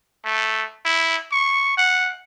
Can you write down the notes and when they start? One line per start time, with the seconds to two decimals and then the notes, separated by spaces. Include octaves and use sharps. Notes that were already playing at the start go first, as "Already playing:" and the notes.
0.25 A3
0.85 E4
1.32 C#6
1.77 F#5